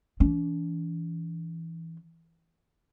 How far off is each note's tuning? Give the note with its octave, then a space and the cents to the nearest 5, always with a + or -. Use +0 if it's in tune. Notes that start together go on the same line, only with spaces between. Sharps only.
E3 +0 D4 -45